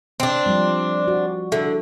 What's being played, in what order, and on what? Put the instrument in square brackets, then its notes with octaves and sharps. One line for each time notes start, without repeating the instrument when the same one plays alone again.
[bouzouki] C4 D4
[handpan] F3 G3
F#4
[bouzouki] D3 [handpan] E5